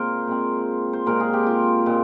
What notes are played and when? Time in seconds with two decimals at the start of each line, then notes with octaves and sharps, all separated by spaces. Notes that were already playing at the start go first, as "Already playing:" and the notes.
Already playing: A#2 G#3 C4 A#4 C5
0.27 A#2 G#3 C4
0.93 C5
1.06 A#2 G#3 C4 A#4
1.20 G#4
1.33 G4
1.47 F4
1.86 A#2 G#3 C4